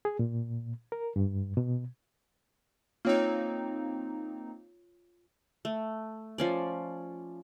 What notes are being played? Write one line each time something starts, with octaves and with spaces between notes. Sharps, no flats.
G#4
A#2
A#4
G2
B2
A#3 C4 D#4 F4 C#5
A3
F3 C#4 D5